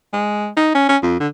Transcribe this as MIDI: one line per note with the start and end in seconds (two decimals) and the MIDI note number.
0.13 0.47 56
0.57 0.71 63
0.75 0.87 61
0.89 0.97 61
1.03 1.16 41
1.20 1.28 50